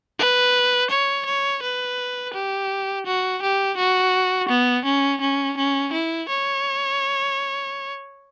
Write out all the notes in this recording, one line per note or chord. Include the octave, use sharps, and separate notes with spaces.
B4
C#5
C#5
B4
G4
F#4
G4
F#4
B3
C#4
C#4
C#4
E4
C#5